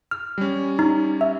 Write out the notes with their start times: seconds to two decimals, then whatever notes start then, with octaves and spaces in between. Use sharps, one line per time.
0.11 F6
0.38 G3 C#4
0.79 D#4
1.21 E5